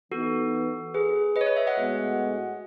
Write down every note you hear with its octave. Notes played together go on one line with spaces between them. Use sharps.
E3 B3 D#4 F#4 A4
G#4 B4
B4 D#5
C#5
B4 D#5
C#5 E5
D#5 F#5
A2 G#3 B3 F#4